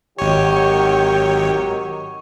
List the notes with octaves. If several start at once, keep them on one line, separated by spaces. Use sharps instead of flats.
G#1 D#3 F#3 G4 C#5 C#6